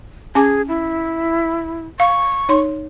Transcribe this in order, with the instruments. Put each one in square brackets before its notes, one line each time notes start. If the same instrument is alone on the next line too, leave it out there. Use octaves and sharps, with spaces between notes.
[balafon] C#4 G#5 D6 [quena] G#4
[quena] E4
[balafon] F5 [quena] C#6
[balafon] D#4 C#5 C6